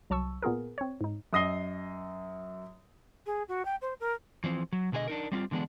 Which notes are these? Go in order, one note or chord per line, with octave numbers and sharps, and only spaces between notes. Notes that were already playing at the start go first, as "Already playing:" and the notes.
C2 F#3 A5 C#6 E6
A#2 B3 F4 G#4 A#4
C4 C#5
G#2 D#4
F#2 D#5 D#6 A#6 C7 G7
G#4
F#4
G5
C5
A#4
E3 F3 C4
F#3
B2 D3 G#4 A#4 D#5
D4 D#4 A#4
G3 C4 E4 F4
D3 E3 G#3 B3 D4